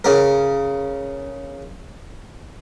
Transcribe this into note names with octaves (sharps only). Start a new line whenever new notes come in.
C#3 A#4